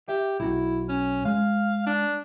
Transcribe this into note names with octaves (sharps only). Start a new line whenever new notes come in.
G4 E5
B1 E4 F#4
C#4
G#3 F5
D4